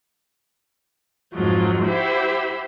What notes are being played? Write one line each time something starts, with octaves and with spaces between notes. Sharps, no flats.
F2 G#2 F3 F#3
E4 F#4 G4 C5 E5